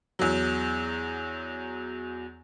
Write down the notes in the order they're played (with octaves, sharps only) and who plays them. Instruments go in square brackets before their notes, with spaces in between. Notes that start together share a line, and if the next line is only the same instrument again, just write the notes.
[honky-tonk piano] E2 F#3